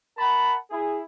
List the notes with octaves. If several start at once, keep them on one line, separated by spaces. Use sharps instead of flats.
A#4 F#5 A5 B5
E4 G#4